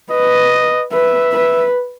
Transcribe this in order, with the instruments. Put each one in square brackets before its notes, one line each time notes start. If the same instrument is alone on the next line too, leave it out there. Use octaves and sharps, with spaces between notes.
[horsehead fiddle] B4 [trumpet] D#5
[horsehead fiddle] B4 [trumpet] E5
[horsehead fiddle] B4